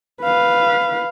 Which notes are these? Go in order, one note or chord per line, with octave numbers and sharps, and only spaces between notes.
B4 F5